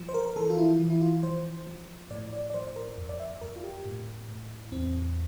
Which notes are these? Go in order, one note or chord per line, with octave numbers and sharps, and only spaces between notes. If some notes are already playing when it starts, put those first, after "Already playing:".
Already playing: F3
C5
A#4
A#4
E3 A4
F4
E4
E3
E4
F4
F3 C5
F3
A2 D5
D5
D5
F3 C5
C5
A#4
F2
D5
E5
F2 A#4
F4
G4
A2
A2
E2 C4